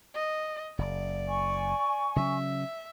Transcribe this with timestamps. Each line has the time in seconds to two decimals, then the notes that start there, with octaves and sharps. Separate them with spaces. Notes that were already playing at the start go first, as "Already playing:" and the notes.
0.14 D#5
0.78 F#1 D5
1.28 G#5 C#6
2.16 C#3 F#3 C#4 E5